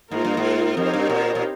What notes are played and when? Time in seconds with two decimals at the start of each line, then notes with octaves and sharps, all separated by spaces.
0.11 G#2 A#3 F4 A#4
0.25 G2
0.37 G#2
0.77 F2 C4 D#4 G4 A#4 C#5
0.94 G2
1.10 A#2
1.35 A#2